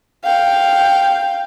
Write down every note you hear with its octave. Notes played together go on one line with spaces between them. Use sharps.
F5 G5